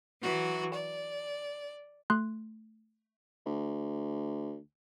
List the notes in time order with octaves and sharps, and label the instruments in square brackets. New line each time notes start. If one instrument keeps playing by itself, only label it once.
[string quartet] E3 F#3 F#4
D5
[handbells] A3 C6 F#6
[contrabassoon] D2